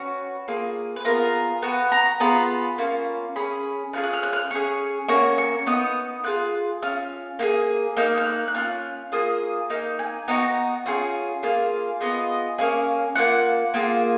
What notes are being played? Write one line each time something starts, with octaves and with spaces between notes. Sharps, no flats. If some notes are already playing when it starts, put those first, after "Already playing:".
Already playing: C#4 F#4 B4
A#3 F4 G#4
B4
B3 F4 G#4 A#4
B3 F#4 B4
A#5
B3 F4 G#4 B5
A#3 C#4 F4
C#4 G#4 B5
C#4 F4 G#4 F6
F#6
F6
F#6
F6
C#4 G#4 C#6
A#3 C#4 F#4 C#6
C#6
B3 D#4 D#6
A#3 F4 G#4 F#6
C#4 F4 F6
A#3 F4 G#4
A#3 D#4 F6
F6
F#6
F#6
C#4 F4 F6
A#3 F4 G#4 D#6
A#3 D#4 F6
G#5
B3 D#4 F#4
C#4 F4 G#4
A#3 F4 G#4 F5
B3 F4 G#4 D#5
A#3 C#4 G#4 F5
A#3 C#4 F4 F#5
A#3 F4 G#4